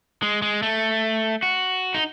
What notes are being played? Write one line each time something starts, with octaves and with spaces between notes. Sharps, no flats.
G#3
G#3
A3
F#4
D#4